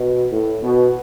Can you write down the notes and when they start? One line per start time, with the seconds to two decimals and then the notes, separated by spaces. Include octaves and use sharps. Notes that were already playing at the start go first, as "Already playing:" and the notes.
Already playing: B2
0.31 A2
0.62 B2